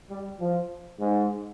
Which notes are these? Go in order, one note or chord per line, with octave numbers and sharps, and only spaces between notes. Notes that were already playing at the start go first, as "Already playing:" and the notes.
G3
F3
G#2